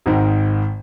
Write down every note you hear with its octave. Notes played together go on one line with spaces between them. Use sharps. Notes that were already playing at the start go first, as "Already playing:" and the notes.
G#1 G#2 D#3